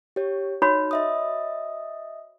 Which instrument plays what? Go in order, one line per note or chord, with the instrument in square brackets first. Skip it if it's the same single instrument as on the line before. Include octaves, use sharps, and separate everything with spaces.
[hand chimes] G4 C#5
[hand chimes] D#4 [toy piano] F#4 C#5 B5
[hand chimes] D#5 E5 D#6